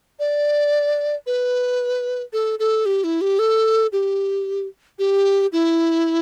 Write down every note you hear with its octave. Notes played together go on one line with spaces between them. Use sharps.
D5
B4
A4
A4
G4
E4
G4
A4
G4
G4
E4